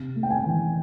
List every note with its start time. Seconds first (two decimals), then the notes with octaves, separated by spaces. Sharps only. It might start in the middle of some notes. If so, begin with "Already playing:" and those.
Already playing: C3
0.16 A3
0.23 G5
0.30 G#5
0.46 E3